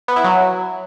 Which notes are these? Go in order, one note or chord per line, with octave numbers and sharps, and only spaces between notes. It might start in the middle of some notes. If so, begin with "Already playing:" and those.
B3
E4
F#3